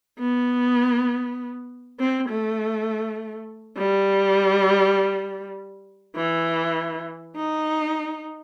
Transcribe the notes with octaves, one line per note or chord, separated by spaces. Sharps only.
B3
C4
A3
G3
E3
D#4